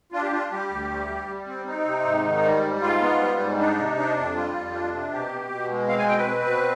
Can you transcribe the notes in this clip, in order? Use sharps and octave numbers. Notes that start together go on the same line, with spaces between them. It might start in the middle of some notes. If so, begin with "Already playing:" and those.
D4 F4
G4
D4 F4
G3 G4
D2
G3
G3
G3
C4
C4 D#4
C3
G#2
D#3
G3
G#2
G#2 F4
B3
G3
G#2
D4 D#4
C3
D4
F2
G3 F4
F2
D4
C3
B2 G4
B2
B2
G#3
C4 F5
G#5
B2 G5
B4
C4
B2